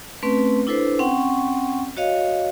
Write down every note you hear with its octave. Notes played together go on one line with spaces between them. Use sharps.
A3 C4 C#4 B4
D4 E4 A4 B4 C5
C4 C#4 F#5 G5 C#6
F#4 C#5 D#5 F5